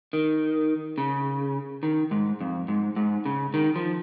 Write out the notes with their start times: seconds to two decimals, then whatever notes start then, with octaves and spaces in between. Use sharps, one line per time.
0.13 D#3
0.98 C#3
1.83 D#3
2.11 G#2
2.41 F2
2.68 G#2
2.96 G#2
3.26 C#3
3.54 D#3
3.76 F3